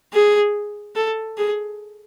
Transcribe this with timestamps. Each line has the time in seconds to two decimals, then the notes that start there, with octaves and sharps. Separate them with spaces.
0.13 G#4
0.96 A4
1.38 G#4